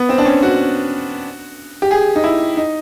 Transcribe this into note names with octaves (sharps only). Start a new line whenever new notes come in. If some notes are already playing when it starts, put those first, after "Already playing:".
Already playing: B3
C4
D4
C#4
F#4
G4
G#4
D#4
E4
D#4